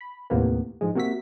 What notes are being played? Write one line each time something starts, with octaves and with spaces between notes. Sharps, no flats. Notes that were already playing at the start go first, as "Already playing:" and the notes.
B5
D#2 A2 C3 A#3 B3
G#2 F3 G#3
C3 A#3 F#4 E5 B6